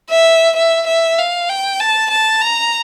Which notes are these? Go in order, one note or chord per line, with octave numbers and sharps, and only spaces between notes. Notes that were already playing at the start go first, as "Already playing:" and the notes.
E5
E5
E5
F5
G5
A5
A5
A#5